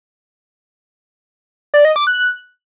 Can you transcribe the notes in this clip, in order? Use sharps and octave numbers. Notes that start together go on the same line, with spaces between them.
D5
D#5
D6
F#6